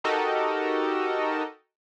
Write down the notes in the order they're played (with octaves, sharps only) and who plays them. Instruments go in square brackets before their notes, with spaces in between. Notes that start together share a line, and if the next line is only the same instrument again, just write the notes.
[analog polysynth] D#4 F#4 G4 A4 A#4 D#5